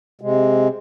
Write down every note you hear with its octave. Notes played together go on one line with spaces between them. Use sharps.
C3 G#3